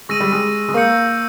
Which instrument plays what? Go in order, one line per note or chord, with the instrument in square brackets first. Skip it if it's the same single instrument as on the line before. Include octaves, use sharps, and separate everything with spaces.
[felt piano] G#3 [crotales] C#6 E6 A#6 D#7
[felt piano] G3
G#3
G#3
[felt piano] A#3 [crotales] C#6 E6 G6 C#7